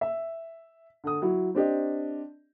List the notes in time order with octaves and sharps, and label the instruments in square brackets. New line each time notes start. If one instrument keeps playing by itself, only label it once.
[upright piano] E5
D3 D#6
F#3 E4
C4 D4 G4 D#5